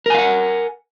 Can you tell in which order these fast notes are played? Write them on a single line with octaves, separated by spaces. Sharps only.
A#4 G#5 F5 F#5